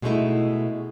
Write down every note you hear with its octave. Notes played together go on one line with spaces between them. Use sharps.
B2 G#3 A3 C#4 D#4 E4